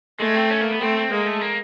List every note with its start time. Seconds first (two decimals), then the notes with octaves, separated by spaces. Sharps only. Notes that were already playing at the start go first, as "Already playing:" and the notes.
0.20 G#3 A3
0.34 C4
0.50 C#4
0.61 A#3
0.71 B3
0.81 A3 C4
0.97 C4
1.11 G#3 A#3
1.26 A3
1.41 A#3